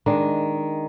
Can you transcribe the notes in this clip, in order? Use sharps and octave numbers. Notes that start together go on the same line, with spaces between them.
D#3 G#3 D4